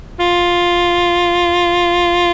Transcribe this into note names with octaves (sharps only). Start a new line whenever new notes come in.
F4